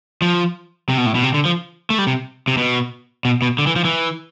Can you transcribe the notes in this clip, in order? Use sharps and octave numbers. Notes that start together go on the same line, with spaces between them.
F3
C3
B2
A2
B2
C3
D3
F3
A3
G3
C3
C3
B2
B2
B2
D3
E3
F3
E3